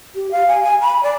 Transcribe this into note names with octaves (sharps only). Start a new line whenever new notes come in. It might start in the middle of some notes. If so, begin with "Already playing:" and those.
G4
F5
G#5
G#5
B5
D5